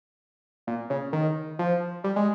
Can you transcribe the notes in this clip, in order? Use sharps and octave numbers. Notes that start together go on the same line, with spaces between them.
A#2
C#3
D#3
F3
G3
G#3